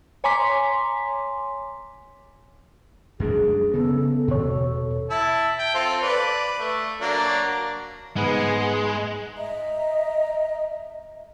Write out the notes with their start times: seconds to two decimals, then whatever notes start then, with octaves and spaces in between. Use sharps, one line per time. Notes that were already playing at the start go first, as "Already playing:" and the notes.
0.24 C#5 G#5 A#5 C6 D6 B6
3.20 F#2 G#3 D4 G#4
3.74 C#3 B3 A4
4.28 E2 B2 A4 C#5
5.10 E4 E5 A5
5.59 G5
5.74 C4 F4 A4
6.02 B4 D5
6.59 A3
7.01 F#3 A#3 D4
8.16 G#2 G#3 B3 G#4
9.37 D#5 E5 A#5